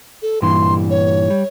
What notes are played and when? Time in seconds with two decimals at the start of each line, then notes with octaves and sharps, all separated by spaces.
0.22 A4
0.42 G2 A#2 E3 C6
0.90 C#5
1.30 G3